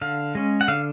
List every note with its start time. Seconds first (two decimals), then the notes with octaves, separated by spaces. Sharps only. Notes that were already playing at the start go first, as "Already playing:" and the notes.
0.02 D3 F5
0.35 G#3 C#4
0.61 F#5
0.68 D3 F5